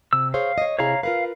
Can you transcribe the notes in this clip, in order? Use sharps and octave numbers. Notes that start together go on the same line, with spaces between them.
C3 E6
G#4 C5 C#5 F5
C#5 D#5
C3 E4 G#4 C#5 F5 A#5
F4 A#4 B4 F5